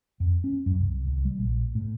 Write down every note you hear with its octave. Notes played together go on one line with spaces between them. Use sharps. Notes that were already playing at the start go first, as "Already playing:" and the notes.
F2
C#4
F#2
C2
C2
G3
A#1
A2